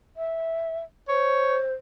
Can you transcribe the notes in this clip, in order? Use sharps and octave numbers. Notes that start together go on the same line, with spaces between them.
E5
C5 C#5